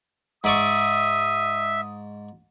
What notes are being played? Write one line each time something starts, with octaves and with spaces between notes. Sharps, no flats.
G#2 D5 E5 C#6 D#6